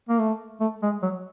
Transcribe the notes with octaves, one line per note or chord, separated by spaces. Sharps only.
A#3
A3
A3
G#3
F#3